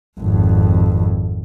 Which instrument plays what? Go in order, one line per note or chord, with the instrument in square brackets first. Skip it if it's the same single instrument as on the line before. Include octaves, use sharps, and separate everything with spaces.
[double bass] G#1 F2